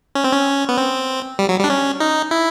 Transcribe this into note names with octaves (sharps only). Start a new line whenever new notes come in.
C#4
C4
C#4
B3
C4
G3
F#3
G3
D4
C#4
D#4
E4